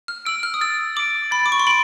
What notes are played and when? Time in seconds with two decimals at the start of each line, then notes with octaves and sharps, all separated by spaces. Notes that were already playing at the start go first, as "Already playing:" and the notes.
0.08 F6
0.25 E6 D7 F#7
0.43 F6
0.54 D#6
0.61 E6 A6
0.96 D6 D7 F#7
1.31 B5 A6
1.46 D6
1.52 C#6
1.60 C6
1.67 B5 D7 F#7